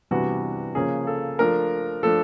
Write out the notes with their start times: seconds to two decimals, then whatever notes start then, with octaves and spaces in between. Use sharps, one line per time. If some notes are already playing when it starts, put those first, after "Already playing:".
0.11 C3 E3 G3 B3 D4 F#4
0.75 C#3 F3 A#3 C#4 G#4
1.07 A4
1.39 F3 A3 D4 A#4
2.03 F3 A3 D4 A4